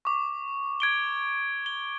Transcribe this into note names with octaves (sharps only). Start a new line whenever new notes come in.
C#6 D6
G#6 D7 G7
G7